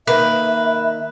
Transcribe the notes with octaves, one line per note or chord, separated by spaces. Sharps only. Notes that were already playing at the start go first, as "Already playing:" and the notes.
D#3 A#3 B4 E5